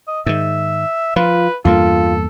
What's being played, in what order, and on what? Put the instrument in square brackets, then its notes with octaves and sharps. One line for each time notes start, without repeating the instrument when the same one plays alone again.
[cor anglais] D#5
[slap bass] G#2 D#3 [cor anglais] E5
[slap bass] F3 [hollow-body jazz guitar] F4 [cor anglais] B4
[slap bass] E2 G2 A#3 [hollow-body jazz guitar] F4 [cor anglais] A4